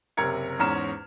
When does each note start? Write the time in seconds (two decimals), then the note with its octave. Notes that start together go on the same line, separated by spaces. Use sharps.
0.17 F#1 C3 A#4 A#5 G#6 C#7
0.59 E2 G#2 C#4 A#5 F6 E7